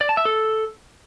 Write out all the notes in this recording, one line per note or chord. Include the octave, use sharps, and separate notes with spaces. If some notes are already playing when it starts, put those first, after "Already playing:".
D5
A5
E5
A4